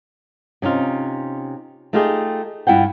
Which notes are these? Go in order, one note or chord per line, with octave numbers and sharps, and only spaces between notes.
C3 C#4 D#4 F4
A3 D#4 F4 G4 G#4
G2 E4 F4 F#5 G5